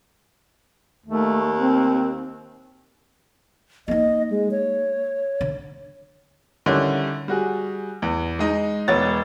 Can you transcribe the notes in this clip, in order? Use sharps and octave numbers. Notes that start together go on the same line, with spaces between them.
D#2 A3
C4
A#3 D#4 D#5
G#3
C#5
D3
D3 D#3 G3 C#4 E4
G3 F#4 G#4
E2
G#3 D#4
E1 B3 C#5 A6